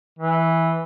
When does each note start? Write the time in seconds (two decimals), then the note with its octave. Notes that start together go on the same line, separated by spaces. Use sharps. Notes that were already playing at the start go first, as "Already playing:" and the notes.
0.19 E3